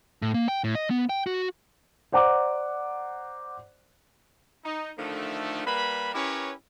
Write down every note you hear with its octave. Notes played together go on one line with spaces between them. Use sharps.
A2
A#3
G5
A2
D#5
B3
G5
F#4
C5 D5 F#5 A#5 D6
D#4
D3 D#3 F3 A3
G3 A#3 B4 B5
C#4 E4 G4 A#4 B4 C#5